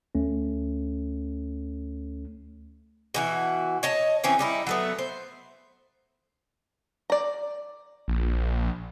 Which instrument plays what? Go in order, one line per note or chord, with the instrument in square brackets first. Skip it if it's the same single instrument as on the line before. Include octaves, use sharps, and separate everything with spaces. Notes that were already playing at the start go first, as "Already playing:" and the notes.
[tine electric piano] D2 A3 C#4
[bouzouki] B2 E3 F#4
C#5 D#5 A5
E3 C4 C#4 G#4
G3 D#4 E4
F#3 A3 B3
C5
[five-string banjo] D5 A#5
[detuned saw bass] A#1